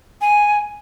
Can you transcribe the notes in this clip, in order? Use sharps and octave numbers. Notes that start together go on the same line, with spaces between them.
G#5